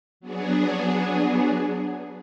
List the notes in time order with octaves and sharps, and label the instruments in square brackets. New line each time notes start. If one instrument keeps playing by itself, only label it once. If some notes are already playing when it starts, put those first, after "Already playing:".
[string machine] F#3 B3 D4 G#4